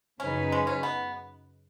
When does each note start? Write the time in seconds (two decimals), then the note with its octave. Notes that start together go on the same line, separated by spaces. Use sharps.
0.20 F#2 C#3 F#3 C#4 D#4 B4
0.52 G#3
0.67 C#4
0.83 B3